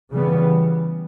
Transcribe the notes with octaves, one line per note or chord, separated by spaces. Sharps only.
C#3 E3 G3 B3